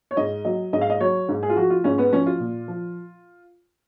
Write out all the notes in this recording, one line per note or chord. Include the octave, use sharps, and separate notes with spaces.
C#5
G#2 D#5
F#3 D#5
G#2 D#5
F5
D#5
F#3 C#5
G#2
G#4
F4
F3 F#4
F4
G#2 C#4
B3
F3 C#4
F4
A#2
F3